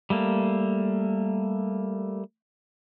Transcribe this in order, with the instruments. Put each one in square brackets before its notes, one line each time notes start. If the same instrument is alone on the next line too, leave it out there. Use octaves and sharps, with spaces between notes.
[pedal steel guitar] G3 A3 A#3